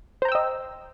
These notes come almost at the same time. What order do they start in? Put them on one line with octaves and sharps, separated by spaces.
C5 A#5 G5 E6 D#5